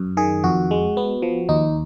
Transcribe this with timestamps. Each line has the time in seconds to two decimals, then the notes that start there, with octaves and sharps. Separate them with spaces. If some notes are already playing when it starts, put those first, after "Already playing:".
Already playing: F#2
0.17 D#3 G#4
0.44 F2 F#4
0.71 G#3
0.97 B3
1.22 F3
1.49 D#2 D#4